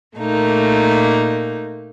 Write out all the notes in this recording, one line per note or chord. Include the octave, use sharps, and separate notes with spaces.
A#2 A3 A#3 D#4